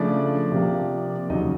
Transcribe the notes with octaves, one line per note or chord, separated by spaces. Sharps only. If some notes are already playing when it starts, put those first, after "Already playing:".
Already playing: C#3 F3 A3 D4 D5
C3 F3 A#3
D#2 C#3 F#3 D#4 D#5